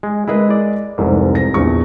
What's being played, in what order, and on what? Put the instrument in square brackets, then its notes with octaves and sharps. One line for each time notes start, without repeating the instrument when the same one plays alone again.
[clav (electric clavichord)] G#3
[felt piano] G#3 A#4 D#5 [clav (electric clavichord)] E4 G#4 B4
[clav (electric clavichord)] D5
[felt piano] F1 [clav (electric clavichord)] C2 G#2
[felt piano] A#6
A#1 E2 C#6